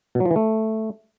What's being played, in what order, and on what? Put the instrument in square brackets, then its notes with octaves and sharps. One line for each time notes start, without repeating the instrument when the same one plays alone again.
[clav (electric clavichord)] B2
F#3
F3
E3
A3